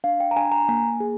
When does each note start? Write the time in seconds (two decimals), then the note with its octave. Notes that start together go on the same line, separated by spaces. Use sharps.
0.04 D4 F5
0.20 G5
0.31 A#5
0.36 D4 G#5
0.52 A#5
0.69 A#3 G#5
1.00 G#4